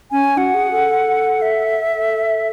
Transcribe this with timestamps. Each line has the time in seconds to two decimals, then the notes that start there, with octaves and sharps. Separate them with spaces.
0.11 C#4 G#5
0.37 F#4 F#5
0.54 G#4
0.72 A4
1.42 E5
1.93 A4